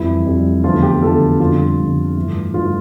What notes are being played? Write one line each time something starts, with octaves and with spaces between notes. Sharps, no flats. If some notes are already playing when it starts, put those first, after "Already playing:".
Already playing: F2 E3 G3 E4
F2 E3 G3
E2 D3 F3 A3 F4
G4
E2 D3 F3 A3 A4
F2 D3 G3 F4
F2 D3 G3
G2 E3 A3
G2 E3 A3 F4